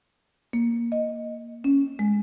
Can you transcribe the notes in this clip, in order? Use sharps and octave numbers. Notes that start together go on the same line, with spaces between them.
A#3
D#5
C#4
G#3